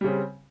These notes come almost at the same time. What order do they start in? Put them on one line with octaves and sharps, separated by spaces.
G3 C#3 C4